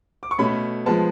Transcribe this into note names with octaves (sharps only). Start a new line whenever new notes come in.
D6
C#6
B2 A3 C#4 B5
F3 G#3 B3 A5